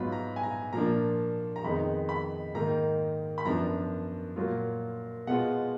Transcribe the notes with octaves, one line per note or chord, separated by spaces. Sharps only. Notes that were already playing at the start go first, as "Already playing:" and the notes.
Already playing: G#2 F#3 B3 F4 B5
A#5
G#5
A#5
A#2 F3 A#3 D4 A#5
A#5
F2 D#3 G#3 B3 D#4 B5
B5
G#2 D#3 A#3 A#5
B5
F#2 F3 B3 D4 A#5
A#2 F#3 A#3 F4
B2 G#3 B3 F4 F#5